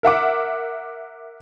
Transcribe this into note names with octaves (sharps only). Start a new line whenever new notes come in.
A#4 E5 F#5 D6